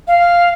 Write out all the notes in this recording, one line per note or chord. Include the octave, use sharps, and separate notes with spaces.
F5